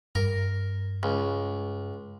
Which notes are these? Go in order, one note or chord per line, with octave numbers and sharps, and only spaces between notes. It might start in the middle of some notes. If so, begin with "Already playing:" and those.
G2 A#4
C#2